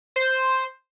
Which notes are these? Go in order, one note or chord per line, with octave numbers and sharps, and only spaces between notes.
C5